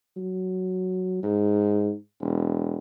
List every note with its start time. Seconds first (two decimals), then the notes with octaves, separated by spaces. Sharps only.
0.17 F#3
1.23 G#2
2.22 E1